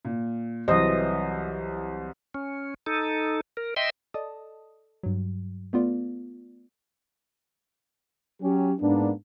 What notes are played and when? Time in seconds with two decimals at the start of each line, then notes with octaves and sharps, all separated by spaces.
0.05 A#2
0.68 C2 E3 F#3 C5 D#5
2.34 C#4
2.86 D#4 A4
3.57 A#4
3.76 D#5 E5 G5 C6
4.14 A4 D5 D#5 A5 D#6
5.03 G2 F#3
5.73 A3 B3 F4 D5
8.42 F#3 C#4 G4
8.80 G#2 A#3 B3 D4